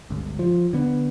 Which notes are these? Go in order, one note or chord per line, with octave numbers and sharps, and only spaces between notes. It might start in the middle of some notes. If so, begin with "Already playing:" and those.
G1 C#2
F3
D3 B3